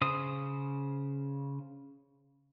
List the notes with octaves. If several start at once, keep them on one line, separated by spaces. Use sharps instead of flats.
C#3 C5 D#6